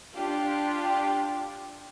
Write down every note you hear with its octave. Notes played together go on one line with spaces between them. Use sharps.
D4 F4 G4